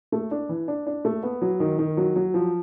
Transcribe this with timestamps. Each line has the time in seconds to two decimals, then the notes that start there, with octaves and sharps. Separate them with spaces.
0.12 A3
0.31 D4
0.49 E3
0.68 D4
0.87 D4
1.05 A3
1.23 B3
1.42 F#3
1.60 D#3
1.78 D#3
1.97 F#3
2.16 F#3
2.34 F3